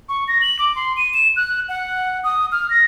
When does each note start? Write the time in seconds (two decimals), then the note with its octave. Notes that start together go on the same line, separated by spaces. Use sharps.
0.09 C#6
0.28 A#6
0.42 F#7
0.59 D6
0.75 C6
0.97 D#7
1.14 E7
1.36 F#6
1.69 F#5
2.24 D#6
2.52 F6
2.70 A#6